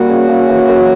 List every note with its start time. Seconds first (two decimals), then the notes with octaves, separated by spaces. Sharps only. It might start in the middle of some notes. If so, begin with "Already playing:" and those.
Already playing: G3 A#3 F#4
0.09 C#3
0.29 C#3
0.49 E3
0.68 F#2